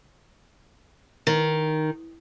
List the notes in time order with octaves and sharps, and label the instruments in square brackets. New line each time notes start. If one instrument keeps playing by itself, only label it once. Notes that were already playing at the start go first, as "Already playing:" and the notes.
[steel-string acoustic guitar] D#3